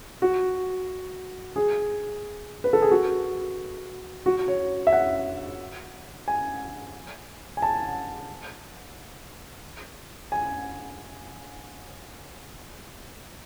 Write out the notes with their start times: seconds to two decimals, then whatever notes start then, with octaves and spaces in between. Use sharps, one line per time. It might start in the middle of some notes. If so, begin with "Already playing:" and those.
0.22 F#4
1.56 G#4
2.64 B4
2.73 A4
2.82 G#4
2.91 F#4
4.26 F#4
4.48 C#5
4.87 E5
4.93 F#5
6.28 G#5
7.57 G#5
7.62 A5
10.32 G#5